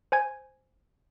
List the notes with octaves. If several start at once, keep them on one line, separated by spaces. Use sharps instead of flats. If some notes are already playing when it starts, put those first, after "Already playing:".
C5 G#5 G#6